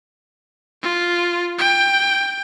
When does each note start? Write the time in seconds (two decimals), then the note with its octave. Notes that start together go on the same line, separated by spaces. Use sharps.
0.82 F4
1.58 G5